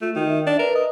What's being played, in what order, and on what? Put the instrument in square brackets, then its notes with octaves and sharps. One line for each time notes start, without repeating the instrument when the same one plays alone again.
[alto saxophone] A3 [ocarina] F4
[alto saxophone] D#3 [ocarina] F#4
[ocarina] E5
[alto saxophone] D4
[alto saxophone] A#4 [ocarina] B4
[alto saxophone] D#5